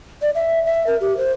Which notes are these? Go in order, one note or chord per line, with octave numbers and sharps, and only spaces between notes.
D5
E5
E5
A#4
G4
C5